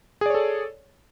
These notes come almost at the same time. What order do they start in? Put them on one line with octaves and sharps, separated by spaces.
G#4 D5 C#5 A4